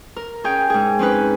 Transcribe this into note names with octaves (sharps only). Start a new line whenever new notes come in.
A#4
C#4 G#4 G5
G#2 G#4
C4 C#4 D#4 B4